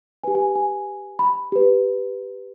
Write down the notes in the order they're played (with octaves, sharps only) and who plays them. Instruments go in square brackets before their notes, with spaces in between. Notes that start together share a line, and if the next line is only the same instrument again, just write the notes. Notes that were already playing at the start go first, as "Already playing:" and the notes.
[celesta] G4 B4 G#5
G#5
G#5
B5
G4 B4